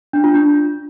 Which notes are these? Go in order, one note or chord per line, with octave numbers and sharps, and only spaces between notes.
D4
F4
D4